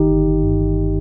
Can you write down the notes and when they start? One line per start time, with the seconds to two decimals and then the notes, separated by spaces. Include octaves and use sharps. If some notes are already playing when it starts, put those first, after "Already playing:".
Already playing: G1 D#3 D#4 G4
0.11 G1
0.27 G1
0.43 G2
0.60 G1